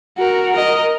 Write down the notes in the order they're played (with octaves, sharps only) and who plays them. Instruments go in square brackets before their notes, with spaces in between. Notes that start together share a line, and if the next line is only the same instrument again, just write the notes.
[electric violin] F#4 A#4
A#4 D#5